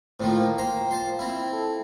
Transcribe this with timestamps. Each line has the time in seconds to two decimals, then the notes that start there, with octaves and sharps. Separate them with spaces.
0.20 A2 D#3 F3 C4
0.37 A#3
0.58 C5 G5 A#5
0.91 F3 C5 A5 C6
1.19 C4 E4
1.53 A4